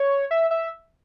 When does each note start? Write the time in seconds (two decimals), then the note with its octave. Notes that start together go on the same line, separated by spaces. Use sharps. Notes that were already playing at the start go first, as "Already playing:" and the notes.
Already playing: C#5
0.31 E5
0.51 E5